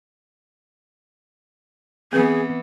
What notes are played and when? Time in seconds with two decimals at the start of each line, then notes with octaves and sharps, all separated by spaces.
2.13 E3 B3 C4 G#4 B4